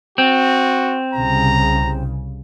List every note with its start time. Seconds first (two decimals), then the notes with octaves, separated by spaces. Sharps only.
0.18 C4 F#4
1.14 C2 C#3 A#5